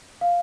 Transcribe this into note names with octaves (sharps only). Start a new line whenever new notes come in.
F5